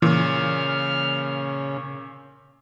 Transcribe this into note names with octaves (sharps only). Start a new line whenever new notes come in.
A#2 C#3 E3 F6